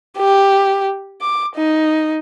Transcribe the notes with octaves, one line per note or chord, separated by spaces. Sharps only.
G4
D6
D#4